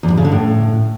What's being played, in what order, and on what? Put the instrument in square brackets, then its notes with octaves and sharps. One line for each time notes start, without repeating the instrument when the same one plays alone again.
[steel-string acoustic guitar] E2
G2
C#3
D3
A2